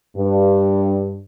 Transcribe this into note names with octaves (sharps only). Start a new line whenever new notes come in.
G2